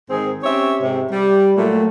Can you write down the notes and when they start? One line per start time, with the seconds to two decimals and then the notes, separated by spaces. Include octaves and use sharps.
0.10 G#2 D#3 C4 G#4
0.43 C4 C#4 G4 C#5 E5
0.80 G#2 C3
1.12 G3
1.56 A#2 F#3 A3